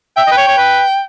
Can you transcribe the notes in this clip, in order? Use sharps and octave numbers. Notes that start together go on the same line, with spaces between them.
E5 G5
D#5
B4
C#5
C#5
B4